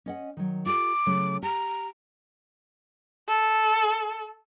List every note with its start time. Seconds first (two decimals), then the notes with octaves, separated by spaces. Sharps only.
0.06 C#4 D#5 F#5
0.37 D#3 F#3
0.66 F4 G4 A4 D6
1.06 C#3 F#3 A3
1.43 G4 A#5
3.29 A4